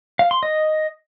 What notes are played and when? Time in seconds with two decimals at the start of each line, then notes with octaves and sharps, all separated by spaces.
0.19 F5
0.31 C6
0.43 D#5